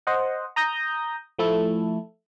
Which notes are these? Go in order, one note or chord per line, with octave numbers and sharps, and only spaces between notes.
C5 D#5 F#5
A#5 D#6 G6 A#6
F3 A3 E4 A4